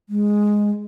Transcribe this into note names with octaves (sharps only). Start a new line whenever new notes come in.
G#3